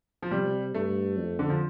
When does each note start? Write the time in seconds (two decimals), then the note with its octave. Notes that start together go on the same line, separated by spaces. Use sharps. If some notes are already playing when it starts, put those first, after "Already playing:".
0.22 F3
0.31 C3 G3
0.74 G2 A3
1.17 F2
1.39 D3
1.49 F3